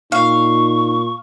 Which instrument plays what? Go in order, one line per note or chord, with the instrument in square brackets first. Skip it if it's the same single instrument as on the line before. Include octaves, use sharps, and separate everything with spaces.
[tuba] A#2 [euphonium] D#4 [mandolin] F5 [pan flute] C#6